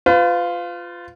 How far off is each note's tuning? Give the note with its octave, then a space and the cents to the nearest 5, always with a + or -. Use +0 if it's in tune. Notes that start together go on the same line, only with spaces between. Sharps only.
F4 +0 B4 +40